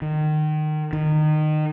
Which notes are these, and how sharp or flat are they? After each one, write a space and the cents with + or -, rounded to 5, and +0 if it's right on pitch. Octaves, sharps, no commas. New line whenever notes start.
D#3 -25
D#3 -25